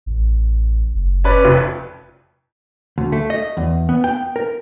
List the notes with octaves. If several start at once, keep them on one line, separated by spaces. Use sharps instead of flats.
A1
F#1
C#4 B4 D5
F1 F2
D2
A3
D#5
E2
B3
G5
A#4